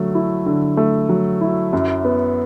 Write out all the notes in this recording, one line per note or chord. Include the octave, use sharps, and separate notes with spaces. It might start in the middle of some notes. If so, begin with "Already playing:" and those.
Already playing: D3 F#3 A3
E4
D3
A3
F#3
E4
F#2
B3